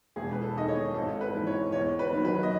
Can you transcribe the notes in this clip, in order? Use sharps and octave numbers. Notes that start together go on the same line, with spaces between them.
E1 G#4
B4
A4
E2 D#3 D#5
C#5
G#1 A4
B4
G#2 E3
C#5
E2 C#5
B4
D#3 F#3
B4
D#5